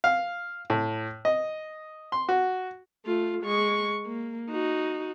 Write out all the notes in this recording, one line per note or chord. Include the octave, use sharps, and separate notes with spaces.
F5
A2
D#5
C6
F#4
A3 F4
G#3 C#6
A#3
D#4 F#4